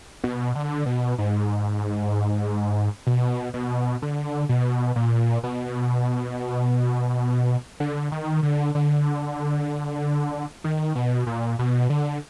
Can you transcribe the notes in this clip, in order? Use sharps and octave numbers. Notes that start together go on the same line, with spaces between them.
B2
D3
B2
G#2
B2
B2
D3
B2
A#2
B2
D3
D#3
D3
D3
D#3
B2
A#2
B2
D3